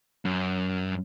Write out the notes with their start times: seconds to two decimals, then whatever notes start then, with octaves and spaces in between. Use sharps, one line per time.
0.25 F#2